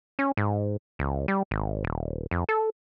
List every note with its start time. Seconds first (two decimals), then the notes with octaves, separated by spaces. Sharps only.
0.19 C#4
0.37 G#2
0.99 C#2
1.28 G3
1.51 G#1
1.84 D#1
2.31 F2
2.49 A4